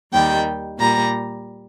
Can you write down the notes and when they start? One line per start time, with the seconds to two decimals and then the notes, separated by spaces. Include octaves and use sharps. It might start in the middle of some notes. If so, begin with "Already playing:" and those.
0.12 D#2 D#3 G3 G5
0.79 A#2 G3 A#5